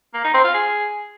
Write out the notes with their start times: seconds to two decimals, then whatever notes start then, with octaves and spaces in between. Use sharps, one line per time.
0.14 A#3
0.24 D#4
0.34 C4
0.44 F4
0.54 G#4